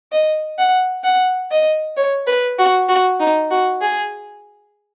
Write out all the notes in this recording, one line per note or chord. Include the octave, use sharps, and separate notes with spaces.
D#5
F#5
F#5
D#5
C#5
B4
F#4
F#4
D#4
F#4
G#4